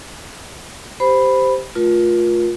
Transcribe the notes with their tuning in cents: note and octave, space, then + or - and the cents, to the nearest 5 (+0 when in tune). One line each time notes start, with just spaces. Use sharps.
G4 +0 C5 -15 B5 +0
A3 -10 F4 +15 A#4 +40